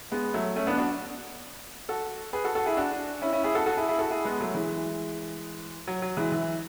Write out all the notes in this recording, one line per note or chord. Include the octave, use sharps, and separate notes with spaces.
G#3 B3
F#3 A3
A3 C#4
B3 D4
D4 F#4
F#4 A4
G#4 B4
F#4 A4
F#4 A4
E4 G#4
D4 F#4
C#4 E4
C#4 E4
E4 G#4
F#4 A4
F#4 A4
E4 G#4
E4 G#4
F#4 A4
E4 G#4
G#3 B3
F#3 A3
E3 G#3
F#3
F#3
E3 G#3
E3